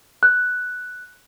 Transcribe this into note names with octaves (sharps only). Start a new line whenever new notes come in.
F#6